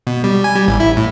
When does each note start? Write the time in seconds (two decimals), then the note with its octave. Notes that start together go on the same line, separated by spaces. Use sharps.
0.07 B2
0.24 G3
0.44 G#5
0.56 G3
0.68 A1
0.80 E4
0.97 A2